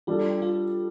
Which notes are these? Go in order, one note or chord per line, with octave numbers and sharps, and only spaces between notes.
G3 D4 F4 A4
F4